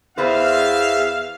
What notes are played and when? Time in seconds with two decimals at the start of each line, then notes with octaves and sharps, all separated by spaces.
0.18 E2 B3 B4 C5 E5 F5